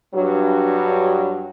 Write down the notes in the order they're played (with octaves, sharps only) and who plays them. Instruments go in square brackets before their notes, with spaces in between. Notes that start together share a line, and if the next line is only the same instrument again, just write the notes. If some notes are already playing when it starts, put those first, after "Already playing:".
[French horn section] G2 F#3